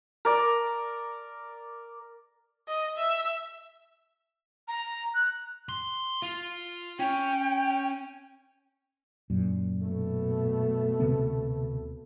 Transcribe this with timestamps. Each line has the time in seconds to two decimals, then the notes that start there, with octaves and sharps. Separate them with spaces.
0.25 A#4 D5
2.68 D#5
2.97 E5
4.68 A#5
5.14 F#6
5.69 C6
6.22 F4
6.99 C#4 G5
9.30 F#2 A#2
9.83 B2 A3
11.00 D2 C3 B3